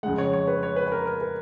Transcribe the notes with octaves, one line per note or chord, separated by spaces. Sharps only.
F2 C#3 G#3 F#5
C#5
C#5
B4
C#5
B4
B4
A#4
A#4
B4